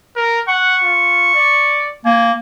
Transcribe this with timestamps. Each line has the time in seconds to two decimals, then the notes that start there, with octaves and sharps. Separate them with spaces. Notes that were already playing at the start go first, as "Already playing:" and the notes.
0.16 A#4
0.48 F#5 C#6
0.83 F4
1.34 D5
2.05 A#3 G#5